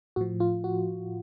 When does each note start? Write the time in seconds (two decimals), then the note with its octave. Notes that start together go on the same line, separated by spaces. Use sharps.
0.16 A2 F3 F#4
0.40 F4
0.64 F#4